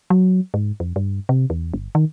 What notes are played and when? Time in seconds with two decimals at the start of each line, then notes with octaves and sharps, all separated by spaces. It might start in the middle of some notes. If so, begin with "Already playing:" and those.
0.10 F#3
0.54 G#2
0.80 F2
0.96 G2
1.29 C3
1.50 E2
1.74 G1
1.95 D#3